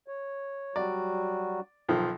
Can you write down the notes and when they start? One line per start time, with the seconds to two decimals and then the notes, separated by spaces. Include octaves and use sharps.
0.08 C#5
0.76 F#3 G3 F#4 D5
1.89 B1 D#3 F3